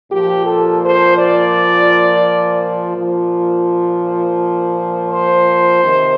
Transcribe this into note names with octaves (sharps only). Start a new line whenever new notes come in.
A#2 F3 G4
A4
C5
D5
A#2 F3
C5
C3 D#3